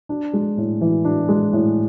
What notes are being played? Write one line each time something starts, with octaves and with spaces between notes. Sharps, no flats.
D4
G#3
A2
E3
D4
G#3
A2